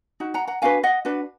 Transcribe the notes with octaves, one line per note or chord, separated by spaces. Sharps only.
D#4 F#4
F#5 A#5
F#5 A#5
D4 F#4 B4 F5 G#5
D#5 F#5
D4 F#4 B4